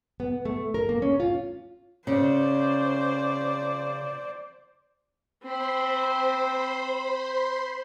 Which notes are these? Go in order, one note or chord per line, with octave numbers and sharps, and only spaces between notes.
B3
A3
A#4
A#3
C#4
F4
C#3 C5 D5
C4 C5 B5 C6